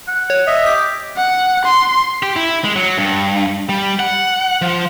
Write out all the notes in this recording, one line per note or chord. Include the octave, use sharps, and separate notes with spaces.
F#5
C#5
D#5 E5
G4 B6
F#5
C6
G4
E4
G#3
F#3
G2
G3
F#5
F3